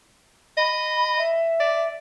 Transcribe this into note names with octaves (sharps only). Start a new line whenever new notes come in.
D#5 B5
E5
D5